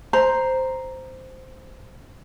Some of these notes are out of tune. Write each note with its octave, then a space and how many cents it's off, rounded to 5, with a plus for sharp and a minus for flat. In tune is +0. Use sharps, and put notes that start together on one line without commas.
C5 -5 A#5 +0